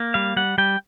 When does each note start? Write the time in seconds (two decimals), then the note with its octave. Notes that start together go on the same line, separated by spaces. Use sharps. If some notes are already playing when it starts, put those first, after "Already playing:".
Already playing: A#3
0.14 G3 F5
0.36 G3 F#5
0.58 G3 G5